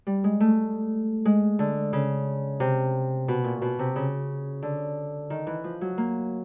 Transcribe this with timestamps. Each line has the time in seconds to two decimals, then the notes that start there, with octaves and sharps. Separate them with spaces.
0.07 G3
0.24 G#3
0.40 A3
1.25 G#3
1.59 D3
1.93 C#3
2.60 C3
3.28 B2
3.44 A#2
3.62 B2
3.79 C3
3.96 C#3
4.63 D3
5.30 D#3
5.47 E3
5.64 F3
5.81 F#3
5.98 A#3